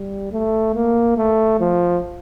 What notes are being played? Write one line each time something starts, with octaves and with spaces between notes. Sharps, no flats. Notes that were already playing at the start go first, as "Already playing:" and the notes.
Already playing: G3
A3
A#3
A3
F3